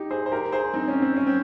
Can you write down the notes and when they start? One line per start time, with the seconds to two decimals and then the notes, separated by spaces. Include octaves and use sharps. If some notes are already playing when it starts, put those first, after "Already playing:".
Already playing: D#4 G4
0.11 G#4 C5
0.26 C5
0.32 G4 A#4
0.52 G#4 C5
0.73 C4 D#4
0.88 C#4
1.02 C4
1.17 C#4
1.27 C4